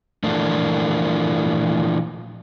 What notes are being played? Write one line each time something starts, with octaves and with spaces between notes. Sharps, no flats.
A#2 E3 F3 A3 A#3 D4